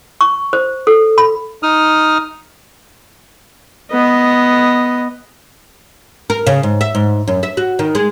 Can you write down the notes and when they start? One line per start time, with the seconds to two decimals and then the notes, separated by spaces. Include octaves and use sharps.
0.21 C#6
0.53 C5
0.87 A4
1.18 B5
1.63 D#4 D#6 F6
3.92 B3 D#5
6.30 A#4
6.47 C#3
6.63 G#2
6.81 E5
6.95 G#2
7.27 F#2
7.43 E5
7.57 F#4
7.79 D#3
7.95 G#3